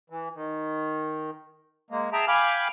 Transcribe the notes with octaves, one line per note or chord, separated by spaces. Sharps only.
E3
D#3
G#3 A#3
G#4 E5 G5 A5 A#5
F5 G5 G#5 B5 D6 F6